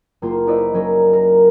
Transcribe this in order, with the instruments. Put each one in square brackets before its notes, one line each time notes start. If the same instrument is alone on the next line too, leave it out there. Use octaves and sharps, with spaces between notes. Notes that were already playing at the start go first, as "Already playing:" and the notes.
[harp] F#1 A#3 F4
D#4 E4 B4 C5 D5 D#5
F#3 C#4 A#4
A#4